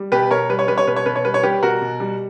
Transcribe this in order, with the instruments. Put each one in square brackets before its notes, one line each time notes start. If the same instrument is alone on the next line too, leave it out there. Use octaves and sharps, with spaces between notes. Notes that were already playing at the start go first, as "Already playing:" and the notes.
Already playing: [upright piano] G3
B2 G4 B4
B2 A#4 C#5
G3 B4
C#5
G3 B4
C#5
B2 B4
C#5
B2 B4
C#5
G3 B4
C#5
G3 G4 B4
B2 F#4 A#4
B2
G3